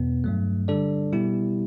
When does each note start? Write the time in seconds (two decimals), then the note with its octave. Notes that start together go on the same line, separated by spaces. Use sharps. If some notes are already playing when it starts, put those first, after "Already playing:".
Already playing: E2 B2 B3
0.24 G2 F#3 A3
0.68 D3 G3 D4 A4 D5
1.13 B2 G3 B3 E4 G4